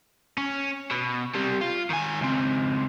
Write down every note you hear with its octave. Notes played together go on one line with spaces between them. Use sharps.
C#4
B2
C3 G3
F4
D#3 G#5
C#2 C4